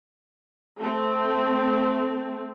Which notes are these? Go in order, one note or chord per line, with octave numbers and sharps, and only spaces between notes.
A3 C4